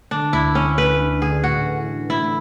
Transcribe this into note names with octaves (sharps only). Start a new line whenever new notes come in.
D3 D4
D2 E4
D2 C#4
D2 B4
D4
D3 G#4
A2 F#4
E3
E3
A2 E4